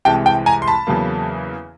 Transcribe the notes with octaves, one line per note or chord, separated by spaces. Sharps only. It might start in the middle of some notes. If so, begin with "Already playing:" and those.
C2 C3 E3 G#3 G5 A5
G5 A5
G#5 A#5
C6
A5 B5
E2 C#3 F#3 A#3